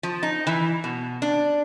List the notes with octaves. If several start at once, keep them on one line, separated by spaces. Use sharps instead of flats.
F3
D#4
E3
B2
D4